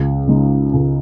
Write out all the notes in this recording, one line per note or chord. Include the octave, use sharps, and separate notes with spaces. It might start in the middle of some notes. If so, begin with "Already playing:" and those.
Already playing: C#2
C#3 G#3 D#4
C#2